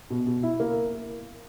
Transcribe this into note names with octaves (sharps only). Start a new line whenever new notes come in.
B2
B2
E4
A#3